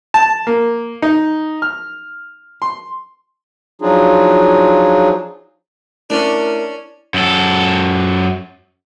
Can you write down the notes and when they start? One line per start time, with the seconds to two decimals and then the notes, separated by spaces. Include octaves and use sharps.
0.14 A5
0.47 A#3
1.02 D#4
1.62 F6
2.62 C6
3.82 F3 F#3 D4 D#4 F4 G#4
6.10 A3 C#4 D4 E4 A#4
7.14 F#2 A4